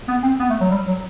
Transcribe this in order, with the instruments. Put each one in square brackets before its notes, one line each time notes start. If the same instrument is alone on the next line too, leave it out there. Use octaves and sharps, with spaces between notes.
[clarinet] B3
C4
B3
A3
F#3
G3
F#3